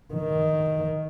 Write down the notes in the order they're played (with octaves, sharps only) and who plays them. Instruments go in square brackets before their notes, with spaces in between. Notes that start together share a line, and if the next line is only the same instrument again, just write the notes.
[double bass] D#3